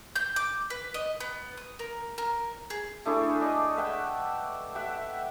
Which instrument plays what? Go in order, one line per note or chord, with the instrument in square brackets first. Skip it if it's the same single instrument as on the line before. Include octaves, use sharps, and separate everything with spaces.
[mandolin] G6
D6
B4
D#5
B3
D#6
A#4
A#4
G#4
[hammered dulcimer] A3 D4 E4 G#4
D5 D#5
B4 E5 F#5 G5
E5 F#5 G5